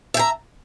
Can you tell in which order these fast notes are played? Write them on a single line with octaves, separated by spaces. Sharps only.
E5 G5 A#5